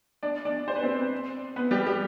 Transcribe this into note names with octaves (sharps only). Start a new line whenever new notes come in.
D4 D5
D4 D5
C5
B4
C4 C5
B3 B4
G3 G4
G3 G4